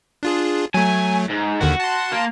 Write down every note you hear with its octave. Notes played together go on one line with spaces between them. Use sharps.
D4 F4 G#4
F#3 A3 G#5
G#2
D#2 D3 D#3 F#4
A5 C6
A#3